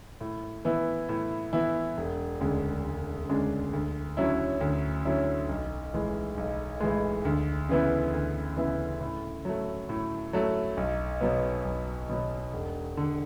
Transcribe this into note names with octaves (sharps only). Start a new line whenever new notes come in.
A2
E3 B3 E4
A2
E3 B3 E4
E1
D2 C#3 G#3 D4
E1
D2 C#3 G#3 D4
D2
D3 F#3 C#4 E4
D2
D3 F#3 C#4 E4
B1
A2 E3 G#3
B1
A2 E3 G#3
D2
C#3 E3 B3 E4
D2
C#3 E3 B3 E4
A2
F#3 A3
A2
F#3 A3
B1
B2 F#3 B3
B1
B2 F#3 B3
E1
D3